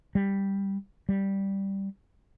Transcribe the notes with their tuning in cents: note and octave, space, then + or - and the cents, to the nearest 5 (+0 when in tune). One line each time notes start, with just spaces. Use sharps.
G3 +5
G3 -5